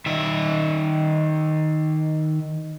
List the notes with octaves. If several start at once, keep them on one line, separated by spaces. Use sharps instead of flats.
D#3 E5